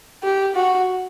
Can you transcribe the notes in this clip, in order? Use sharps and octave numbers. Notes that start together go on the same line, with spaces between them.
G4
F#4